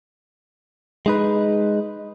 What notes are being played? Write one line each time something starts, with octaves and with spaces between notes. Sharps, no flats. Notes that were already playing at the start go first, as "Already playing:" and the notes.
G#3 D#4 B4